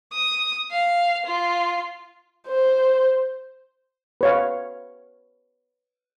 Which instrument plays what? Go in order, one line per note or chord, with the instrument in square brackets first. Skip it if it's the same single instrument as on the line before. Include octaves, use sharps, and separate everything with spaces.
[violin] D#6
F5
F4
[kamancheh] C5
[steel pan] B4 C#5 F5